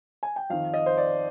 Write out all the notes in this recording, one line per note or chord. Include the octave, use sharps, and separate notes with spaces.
G#5
G5
F2 D#3 F5
D#5
C5
D5